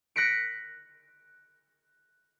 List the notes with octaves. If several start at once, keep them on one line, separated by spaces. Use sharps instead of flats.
F#6 A#6 B6 C#7 D7